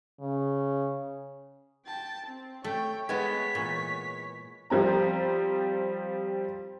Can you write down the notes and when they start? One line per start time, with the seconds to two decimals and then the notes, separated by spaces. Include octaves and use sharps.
0.20 C#3
1.86 G5 A5
2.26 C4
2.64 A3 C#5 G5
3.09 G#3 B3 C#5 B6
3.55 A#2 E3
4.70 F3 G3 C4 A#5